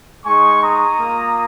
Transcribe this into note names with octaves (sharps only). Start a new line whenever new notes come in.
G#3 D#4 G#5 C#6
A#5 D#6
A#3 F4